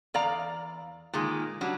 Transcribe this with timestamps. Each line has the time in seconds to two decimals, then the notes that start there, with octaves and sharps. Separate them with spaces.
0.14 E2 D5 F5 A#5
1.13 A#2 D#3 G#3
1.61 F#3 G3 D4